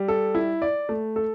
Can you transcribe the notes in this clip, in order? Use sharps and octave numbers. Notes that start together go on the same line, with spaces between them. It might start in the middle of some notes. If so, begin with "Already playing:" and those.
Already playing: G3
A4
E4
D5
A3
A4